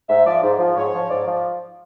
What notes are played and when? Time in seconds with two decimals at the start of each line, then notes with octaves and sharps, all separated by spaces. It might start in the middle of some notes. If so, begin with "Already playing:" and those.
0.09 G#2 E5
0.26 F3 D5
0.43 G#2
0.59 F3
0.77 G#2 C#5
0.94 F3
1.10 G#2 D5
1.27 F3